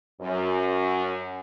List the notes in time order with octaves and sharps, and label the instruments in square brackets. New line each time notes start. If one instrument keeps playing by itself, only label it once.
[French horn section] F#2